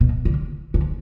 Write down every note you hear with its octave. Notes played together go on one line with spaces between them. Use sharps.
B2
D3
D3